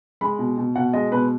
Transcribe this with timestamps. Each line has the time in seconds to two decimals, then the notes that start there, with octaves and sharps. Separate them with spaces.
0.21 G#3 B5
0.39 B2
0.58 B2
0.76 B2 F#5
0.93 G#3 D#5
1.12 B2 B4